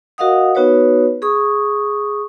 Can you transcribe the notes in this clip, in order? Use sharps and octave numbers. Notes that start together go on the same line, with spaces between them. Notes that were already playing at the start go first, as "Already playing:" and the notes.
F#4 A#4 D#5 F5 F#5 D#6
B3 D#4 F#4 B4 C#5
G#4 C#6 D#6